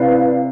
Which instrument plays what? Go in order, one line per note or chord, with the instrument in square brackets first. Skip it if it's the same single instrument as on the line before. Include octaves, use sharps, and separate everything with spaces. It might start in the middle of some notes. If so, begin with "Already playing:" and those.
Already playing: [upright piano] C3 [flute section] E4 B4 D5 F5